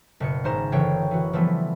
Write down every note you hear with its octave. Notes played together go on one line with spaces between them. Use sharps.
F#1 B2 C#7
G#1 C#4 C5 A#5 E7
F#1 D3 E3 C#5 G5 C7
E3 F#4
E3 F3 G3 A3 B3 C4